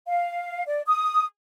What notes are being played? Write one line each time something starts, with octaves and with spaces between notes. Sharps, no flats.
F5
D5
D#6